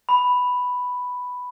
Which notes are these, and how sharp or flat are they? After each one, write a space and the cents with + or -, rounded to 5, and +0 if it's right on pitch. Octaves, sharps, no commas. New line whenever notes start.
B5 +5